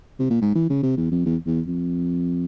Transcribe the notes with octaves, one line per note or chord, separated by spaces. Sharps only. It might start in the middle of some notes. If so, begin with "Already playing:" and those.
C3
A#2
G#2
E3
C#3
C3
E2
F2
E2
E2
F2